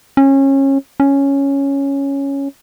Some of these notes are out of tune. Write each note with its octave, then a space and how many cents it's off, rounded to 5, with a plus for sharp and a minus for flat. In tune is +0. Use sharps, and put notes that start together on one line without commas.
C#4 -25
C#4 +0